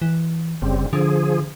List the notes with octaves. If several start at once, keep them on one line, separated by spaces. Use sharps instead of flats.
E3
F#1 C#3 G3 C4
D3 F3 G#4